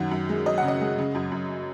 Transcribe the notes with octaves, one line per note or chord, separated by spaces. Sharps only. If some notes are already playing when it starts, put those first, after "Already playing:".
Already playing: F#2 D#3 F#5
F#2
G#3
F#2 D#5
C#3 F#5
D#5
G#3
C#3
F#2
F#2